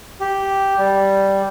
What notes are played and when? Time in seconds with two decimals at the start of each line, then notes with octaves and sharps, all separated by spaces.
0.20 G4
0.78 G3